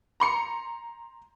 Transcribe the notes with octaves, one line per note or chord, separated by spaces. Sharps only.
A#5 C6 C#7